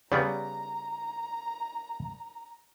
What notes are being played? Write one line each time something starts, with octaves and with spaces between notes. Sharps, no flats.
C#3 G3 B3 D5 A#5